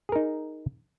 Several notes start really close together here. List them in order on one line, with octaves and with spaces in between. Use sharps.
G#4 A#4 D#4